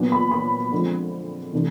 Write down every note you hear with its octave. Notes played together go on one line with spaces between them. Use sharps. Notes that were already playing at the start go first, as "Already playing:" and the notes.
Already playing: A#2 F#3 B3 D4
B5
B5
D3 F3 G#3 C4
C3 E3 A3 D4